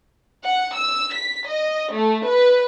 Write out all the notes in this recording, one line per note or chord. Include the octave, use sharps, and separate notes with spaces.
F#5
E6
B6
D#5
A3
B4